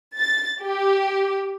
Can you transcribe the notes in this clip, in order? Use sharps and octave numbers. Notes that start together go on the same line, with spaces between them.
A6
G4